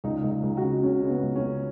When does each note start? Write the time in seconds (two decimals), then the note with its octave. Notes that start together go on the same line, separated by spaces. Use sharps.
0.04 C#2 D#4
0.24 C#2
0.30 D#4
0.43 C#2
0.57 F#4
0.63 C#3
0.83 C#3 C#4
1.02 C#3
1.09 B3
1.23 C#2
1.36 C#4
1.42 C#3